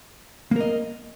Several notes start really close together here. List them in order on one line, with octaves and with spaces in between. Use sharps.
A#3 A#4 D#5